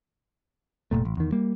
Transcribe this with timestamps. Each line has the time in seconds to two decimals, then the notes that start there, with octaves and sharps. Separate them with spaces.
0.91 F1 G2 A#2 A3
1.05 A1
1.17 E2 D#3
1.32 G3 A#3